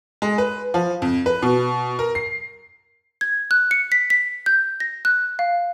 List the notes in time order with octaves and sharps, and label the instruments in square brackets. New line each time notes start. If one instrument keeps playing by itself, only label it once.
[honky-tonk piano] G#3
B4
F3
F2
B4
B2
A#4
C7
[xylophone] G#6
F#6
C#7
B6
B6
G6
A#6
F#6
F5